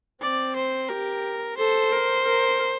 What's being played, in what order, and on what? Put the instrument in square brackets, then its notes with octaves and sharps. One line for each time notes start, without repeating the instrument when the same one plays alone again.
[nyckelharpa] C4 [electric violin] D5
[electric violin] C5
[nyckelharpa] G4 [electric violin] A#4
[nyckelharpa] A4 [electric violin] C5
[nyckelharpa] A#4
A#4